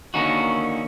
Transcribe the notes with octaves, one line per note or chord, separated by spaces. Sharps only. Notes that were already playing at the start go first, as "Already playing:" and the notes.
D3 D#3 A#3 C#4 D#4 F#4